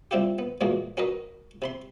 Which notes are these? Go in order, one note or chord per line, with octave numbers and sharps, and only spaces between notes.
G3 C4 E4 F4 G4
B3
A#2 E3 G#3 A#3 F#4 G#4
C#4 F#4 A#4 B4 D#5
C3 B5 C6